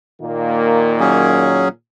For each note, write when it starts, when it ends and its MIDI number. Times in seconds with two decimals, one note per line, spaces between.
0.21 1.69 46
0.21 1.69 51
0.21 1.69 58
1.00 1.68 54
1.00 1.68 61
1.00 1.68 68